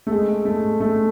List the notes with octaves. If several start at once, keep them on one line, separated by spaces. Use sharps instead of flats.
A3
G#3
A3
A3